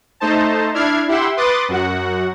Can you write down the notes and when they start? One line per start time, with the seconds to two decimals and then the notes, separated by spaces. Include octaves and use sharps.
0.20 A3 D#4 C5 A5
0.74 D4 E4 F6 G#6 C7
1.08 E4 G4 E5 F#5 C6
1.37 B4 C6 D6 D#6 F#6 A6
1.68 F#2 F#4 F#5